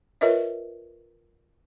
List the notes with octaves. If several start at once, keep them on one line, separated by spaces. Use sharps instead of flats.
F4 A#4 B4 C#5 D#5 E5